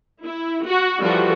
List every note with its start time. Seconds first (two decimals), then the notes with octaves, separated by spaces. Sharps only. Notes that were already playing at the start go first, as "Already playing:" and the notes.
0.24 E4
0.66 F#4
1.01 E3 F3 G3 F#4 A4